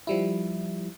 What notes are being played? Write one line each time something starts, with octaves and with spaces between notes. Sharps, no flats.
F3 G3 E4